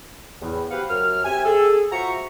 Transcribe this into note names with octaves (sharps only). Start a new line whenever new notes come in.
E2 A2
F#4 G4 B4 C5 F5 F#5
F#2 F6
C4 G4 E5 G#5
G#4 A4
F4 F#4 C5 E5 A#5 C#6